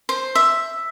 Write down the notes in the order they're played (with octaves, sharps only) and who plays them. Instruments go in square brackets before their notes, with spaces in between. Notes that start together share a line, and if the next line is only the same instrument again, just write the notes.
[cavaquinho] C5
E5